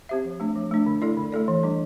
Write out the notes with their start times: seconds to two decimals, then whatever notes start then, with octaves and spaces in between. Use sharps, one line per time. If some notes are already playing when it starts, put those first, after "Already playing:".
0.09 C4 G4 C5 E5
0.24 F3
0.40 A3 D4
0.56 F3
0.71 A3 D4
0.86 D3
1.02 A3 E4 A4 D5
1.17 D3
1.32 A3 E4 A4 D5
1.48 E3
1.63 G3 D4